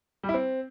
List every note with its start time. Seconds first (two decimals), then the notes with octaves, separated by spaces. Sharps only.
0.23 G3
0.29 E4
0.34 C4